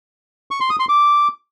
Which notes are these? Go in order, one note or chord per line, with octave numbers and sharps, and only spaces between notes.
C#6
C6
D#6
C6
D6